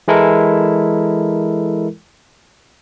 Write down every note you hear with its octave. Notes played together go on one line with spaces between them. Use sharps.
E3 G#3 E4 A4 A#4